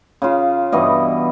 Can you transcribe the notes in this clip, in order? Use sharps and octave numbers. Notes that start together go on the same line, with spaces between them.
C#3 F4
G2 B2 E3 D#5